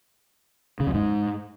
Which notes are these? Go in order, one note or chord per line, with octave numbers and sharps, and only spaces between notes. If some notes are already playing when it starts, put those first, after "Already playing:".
C#3
F2
G#2